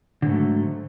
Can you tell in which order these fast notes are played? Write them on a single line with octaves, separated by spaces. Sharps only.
D3 G#2 A3 F#3